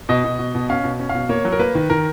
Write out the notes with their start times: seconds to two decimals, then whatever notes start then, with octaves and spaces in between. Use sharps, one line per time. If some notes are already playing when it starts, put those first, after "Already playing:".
0.09 B2 D#5
0.24 B2
0.39 B2
0.55 B2
0.69 C#4 F5
0.84 B2
0.99 C#4
1.09 F5
1.14 B2
1.29 A#3 C#5
1.45 F#3
1.52 A#4
1.59 A#3 B4
1.75 D#3
1.90 D#3 A#4